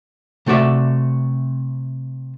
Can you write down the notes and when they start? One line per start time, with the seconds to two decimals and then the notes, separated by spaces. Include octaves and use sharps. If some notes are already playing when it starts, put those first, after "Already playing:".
0.46 C3 A3 F#4 D5 E5